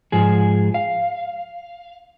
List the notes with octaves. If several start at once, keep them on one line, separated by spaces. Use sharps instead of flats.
G#2 F3 G#4
F5